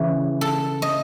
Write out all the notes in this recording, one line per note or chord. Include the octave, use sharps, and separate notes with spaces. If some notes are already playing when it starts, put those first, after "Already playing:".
Already playing: C#3 E3
A4
D#5